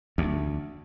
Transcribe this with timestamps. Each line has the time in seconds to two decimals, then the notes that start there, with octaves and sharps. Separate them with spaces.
0.18 D2